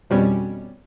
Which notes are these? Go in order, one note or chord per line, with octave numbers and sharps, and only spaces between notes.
F2 B2 G3 C#4